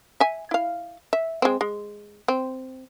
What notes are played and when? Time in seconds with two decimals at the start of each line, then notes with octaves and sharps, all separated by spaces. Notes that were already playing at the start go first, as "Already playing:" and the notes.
0.20 E5 G#5
0.51 E4 F5
1.13 E5
1.42 G#3 C4
1.61 G#3
2.28 C4